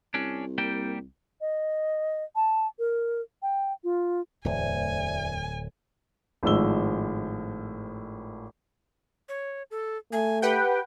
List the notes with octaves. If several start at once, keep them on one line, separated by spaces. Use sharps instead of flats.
C2 C#4 D4
G3 A#3 G5
D#5
A5
A#4
G5
F4
D1 E2 A2 C5 D5 E5 G#5
G#1 A2 F3 G#3 E6 G7
C#5
A4
A3 G#5
G4 B4 F#5 G5